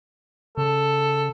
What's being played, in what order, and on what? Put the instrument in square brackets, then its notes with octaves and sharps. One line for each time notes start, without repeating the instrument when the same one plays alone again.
[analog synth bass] C#3 [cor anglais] A4